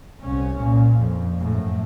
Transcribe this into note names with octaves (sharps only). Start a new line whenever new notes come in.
C2 C#4
A#2
F2
F#2 A2